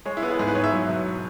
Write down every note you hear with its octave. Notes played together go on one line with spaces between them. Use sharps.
G#3 C#5
E4
B3
G#4
G#2 G#4
B4
G#2 C#5
E5
F#3 C#5
B2
B2